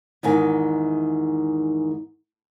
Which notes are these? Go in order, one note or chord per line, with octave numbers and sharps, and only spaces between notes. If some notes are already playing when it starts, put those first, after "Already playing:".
E2 G#2 D#3 G#5